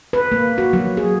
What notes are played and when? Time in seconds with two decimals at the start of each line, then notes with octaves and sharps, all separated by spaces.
0.13 B4
0.32 A#3
0.58 F#4
0.73 F#3
0.97 G#4